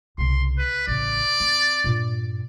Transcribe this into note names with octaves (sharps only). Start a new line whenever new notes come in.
C2 C#3 C6
B4
A1 C#3 D5
C4
G2 A#2